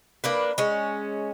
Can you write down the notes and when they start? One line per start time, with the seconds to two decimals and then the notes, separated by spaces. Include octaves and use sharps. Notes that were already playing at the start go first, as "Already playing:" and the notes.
0.24 A#3 D4 B4
0.58 G#3 C#4